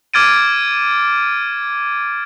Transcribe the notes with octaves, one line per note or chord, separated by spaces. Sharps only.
D6 F6 G#6 A6 D7 D#7